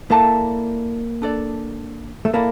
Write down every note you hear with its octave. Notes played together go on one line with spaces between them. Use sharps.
A#3 E4 A4 D5 A5
D4 A4 D5
A3
A#3 E4 A4 D5